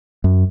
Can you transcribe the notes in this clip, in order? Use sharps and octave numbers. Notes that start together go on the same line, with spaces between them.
F#2